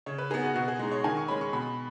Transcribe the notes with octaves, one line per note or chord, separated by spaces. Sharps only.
C#3 C#5
B4
B3 D#4 G#4
F#4
B2 F#4
G#4
G#3 D#4
C#5
D#3 G#5
C#6
G#3 C#4 B5
C#6
B2 B5